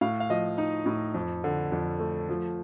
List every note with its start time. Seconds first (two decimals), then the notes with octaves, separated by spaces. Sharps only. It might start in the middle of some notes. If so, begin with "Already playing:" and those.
0.01 A2 F5
0.20 F5
0.30 F3 D#5
0.58 D#4
0.86 A2
1.14 F2
1.44 D3
1.72 F2
2.00 A3
2.29 F3